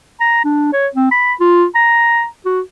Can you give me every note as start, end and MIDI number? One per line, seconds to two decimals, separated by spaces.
0.20 0.42 82
0.44 0.68 62
0.73 0.87 73
0.95 1.09 60
1.11 1.33 83
1.40 1.66 65
1.75 2.26 82
2.45 2.61 66